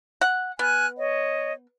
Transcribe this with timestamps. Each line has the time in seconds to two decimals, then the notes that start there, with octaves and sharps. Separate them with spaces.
0.21 F#5
0.59 B3 G#5 F6 F#6
0.98 C#5 D#5